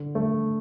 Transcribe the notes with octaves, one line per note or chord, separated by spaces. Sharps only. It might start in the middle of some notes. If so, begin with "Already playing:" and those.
Already playing: D3
A3